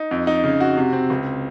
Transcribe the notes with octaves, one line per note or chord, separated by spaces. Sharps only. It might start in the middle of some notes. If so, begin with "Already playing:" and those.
Already playing: D#4
F2
D#4
C#3
F#4
C3
C4
C#2